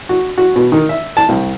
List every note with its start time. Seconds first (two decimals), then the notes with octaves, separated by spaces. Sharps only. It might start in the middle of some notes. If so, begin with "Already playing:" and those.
0.09 F#4
0.38 F#4
0.56 B2
0.72 D#3
0.89 E5
1.17 A5
1.29 C2